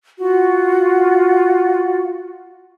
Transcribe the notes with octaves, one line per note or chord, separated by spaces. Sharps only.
F4 F#4 F#5